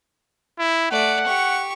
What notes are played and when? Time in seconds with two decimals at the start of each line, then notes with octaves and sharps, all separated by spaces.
0.59 E4
0.91 A3 D5 F#5
1.26 G4 C#6